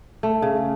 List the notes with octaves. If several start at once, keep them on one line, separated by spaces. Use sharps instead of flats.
A3
C#3